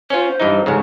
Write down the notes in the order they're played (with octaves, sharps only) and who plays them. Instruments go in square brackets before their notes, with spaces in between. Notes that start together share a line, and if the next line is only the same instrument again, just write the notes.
[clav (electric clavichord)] C#4 F4 [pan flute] C5
[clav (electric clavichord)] G2 E3 D#4
A1 G#2 C#3